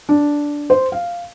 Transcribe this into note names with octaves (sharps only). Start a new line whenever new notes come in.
D4
C5
F5